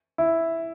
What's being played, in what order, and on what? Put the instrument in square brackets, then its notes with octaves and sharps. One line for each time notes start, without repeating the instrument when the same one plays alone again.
[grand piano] E4